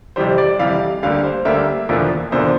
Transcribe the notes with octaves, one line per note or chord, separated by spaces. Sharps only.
F2 C3 E3 G3 C5
D5
F2 C3 E3 G3 F5
D2 D3 G3 A#3 F5
C5
D2 D3 G3 A#3 E5
E1 E2 D3 F3 A#3
E1 E2 D3 F3 A#3 C5